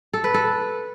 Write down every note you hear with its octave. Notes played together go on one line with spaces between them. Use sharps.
A4
B4
A4